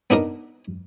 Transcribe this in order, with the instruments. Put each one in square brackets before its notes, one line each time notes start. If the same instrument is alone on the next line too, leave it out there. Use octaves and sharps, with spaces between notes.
[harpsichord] B3 D4 D#4 A#4